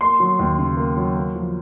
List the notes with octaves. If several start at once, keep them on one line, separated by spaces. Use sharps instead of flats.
A#3 C6
F#3
D#2
C#3
A#3
F#3
A#3
F3